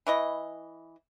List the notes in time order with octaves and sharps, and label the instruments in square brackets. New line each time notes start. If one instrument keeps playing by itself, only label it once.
[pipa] E3 E4 D#5